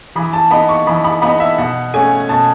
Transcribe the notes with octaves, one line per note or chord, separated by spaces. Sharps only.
E3 B5
A5
B3 D#4 B5
C#6
E3 B5
B5
B3 D#4 B5
E5
B2 F#5
A3 C#4 G#5
B2 A5